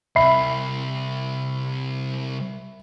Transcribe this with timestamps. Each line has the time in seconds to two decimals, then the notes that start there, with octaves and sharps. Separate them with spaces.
0.16 C2 E5 B5 C7